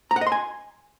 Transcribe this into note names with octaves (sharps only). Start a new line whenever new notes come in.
A#5
F#5
D#5
C6
G#5